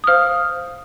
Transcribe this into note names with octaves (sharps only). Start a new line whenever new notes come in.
D#6
C5 F5 F6